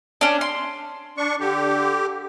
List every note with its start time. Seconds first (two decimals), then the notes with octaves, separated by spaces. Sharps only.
0.21 C#4 D4
0.41 C6
1.17 D4 C#6
1.40 D3 G4